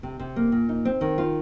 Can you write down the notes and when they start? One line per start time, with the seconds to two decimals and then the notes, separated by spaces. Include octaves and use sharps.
0.03 C3
0.20 C3
0.36 A#3
0.52 A#2
0.69 D#4
0.85 C4
1.01 D#3
1.18 F4